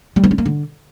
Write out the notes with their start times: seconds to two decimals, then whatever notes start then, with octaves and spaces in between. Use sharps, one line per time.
0.16 G3
0.24 B3
0.31 C#4
0.38 A#3
0.46 D3